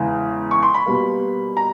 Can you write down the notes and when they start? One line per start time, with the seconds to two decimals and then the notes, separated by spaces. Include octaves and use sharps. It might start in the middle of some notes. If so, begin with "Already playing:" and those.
Already playing: E2 C#3 E3 G#3
0.51 C#6
0.63 C6
0.74 B5
0.86 B2 G3 A#3
1.57 A#5